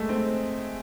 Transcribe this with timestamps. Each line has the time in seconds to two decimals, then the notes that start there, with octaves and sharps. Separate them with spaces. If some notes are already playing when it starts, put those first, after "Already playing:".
Already playing: G#3 A3
0.09 C4